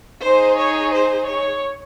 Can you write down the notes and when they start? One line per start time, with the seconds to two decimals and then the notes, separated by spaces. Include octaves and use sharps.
0.23 D#4 G#4 C5
0.59 C#5
0.94 C5
1.30 C#5